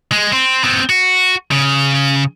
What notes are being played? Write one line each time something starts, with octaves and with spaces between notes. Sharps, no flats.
G#3
C4
B3 C4
F#4
C#3